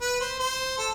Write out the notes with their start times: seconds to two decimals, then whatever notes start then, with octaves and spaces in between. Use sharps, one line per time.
0.01 B4
0.20 C5
0.40 C5
0.78 A4